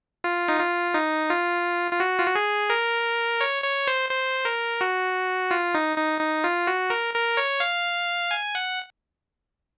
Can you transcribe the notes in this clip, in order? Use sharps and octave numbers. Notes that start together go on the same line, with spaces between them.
F4
D#4
F4
D#4
F4
F4
F#4
F4
F#4
G#4
A#4
C#5
C#5
C5
C5
A#4
F#4
F4
D#4
D#4
D#4
F4
F#4
A#4
A#4
C#5
F5
G#5
F#5